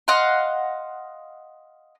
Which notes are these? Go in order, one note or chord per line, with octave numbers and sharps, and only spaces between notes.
D#5 F5 F#5 C6